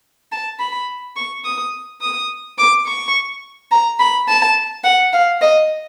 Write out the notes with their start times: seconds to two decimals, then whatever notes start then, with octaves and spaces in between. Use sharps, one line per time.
0.32 A5
0.60 B5
1.16 C#6
1.45 D#6
2.01 D#6
2.58 D6
2.86 C#6
3.71 A#5
3.99 B5
4.28 A5
4.84 F#5
5.13 F5
5.42 D#5